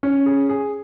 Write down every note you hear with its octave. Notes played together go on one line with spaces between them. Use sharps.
C#4
G#4
G#4